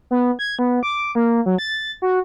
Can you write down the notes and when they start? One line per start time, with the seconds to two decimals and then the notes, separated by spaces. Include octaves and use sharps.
0.11 B3
0.39 G#6
0.59 B3
0.83 D6
1.15 A#3
1.46 F#3
1.58 A6
2.02 F#4